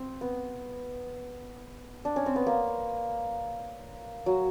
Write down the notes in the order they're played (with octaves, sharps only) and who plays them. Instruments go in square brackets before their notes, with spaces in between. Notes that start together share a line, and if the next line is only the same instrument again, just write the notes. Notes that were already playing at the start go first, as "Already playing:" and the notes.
Already playing: [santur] C4
B3
D4
C#4
C4
B3
A#3
F#3